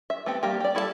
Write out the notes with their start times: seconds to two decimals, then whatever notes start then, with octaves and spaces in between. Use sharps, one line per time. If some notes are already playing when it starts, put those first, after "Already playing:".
0.10 E5
0.26 A3 B3 C4 G4
0.43 G3 A#3 G4
0.60 G4 D5
0.75 G3 E4 A4 D#5 A5